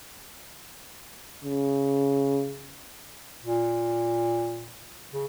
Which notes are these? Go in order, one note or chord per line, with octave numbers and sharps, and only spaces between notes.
C#3
A#2
C#3